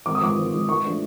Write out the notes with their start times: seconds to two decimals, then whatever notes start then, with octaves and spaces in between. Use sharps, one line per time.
0.06 G#1 D6
0.15 D#6
0.21 G#2 F3 D6
0.38 G#1
0.53 G#2 F3
0.69 G#2 C#6
0.85 F3 A3 D4